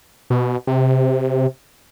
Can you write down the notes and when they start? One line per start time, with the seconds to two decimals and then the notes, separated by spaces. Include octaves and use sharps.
0.30 B2
0.67 C3